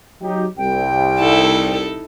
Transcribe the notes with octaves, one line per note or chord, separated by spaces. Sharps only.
F#3 D#4 G4
C2 G5
D#4 E4 A4